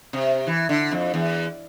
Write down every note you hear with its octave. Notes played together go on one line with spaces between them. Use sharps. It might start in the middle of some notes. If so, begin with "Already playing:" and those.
C3
E3
D3
F2
E2